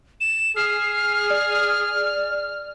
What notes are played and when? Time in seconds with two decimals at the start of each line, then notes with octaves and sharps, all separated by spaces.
0.21 E7
0.56 G#4 F6 C7
1.30 D5